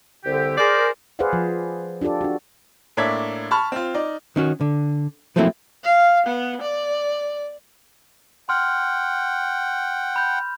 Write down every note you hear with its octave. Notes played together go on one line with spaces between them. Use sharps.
C2 D3 G4
G#4 A#4 C5 D5
G#4 B4 C5 D5 F5 F#5
F3
D4 F4 G4 A4 D5
D4 F#4
A2 A#3 D4 E5 G#6 B6
A5 B5 C#6 F6
C4 F4
D#4 D5
D#3 C#4 F#4
D3
F3 F#3 A3 A#3 C4 E4
F5
B3
D5
F#5 G5 C6 F6
B5 G6